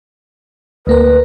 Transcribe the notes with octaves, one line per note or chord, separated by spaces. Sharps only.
D2 A#3 A#4 B4